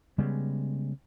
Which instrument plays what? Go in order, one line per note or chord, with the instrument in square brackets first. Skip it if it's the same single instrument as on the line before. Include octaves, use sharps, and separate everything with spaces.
[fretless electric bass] C#3 G3 G#3 B3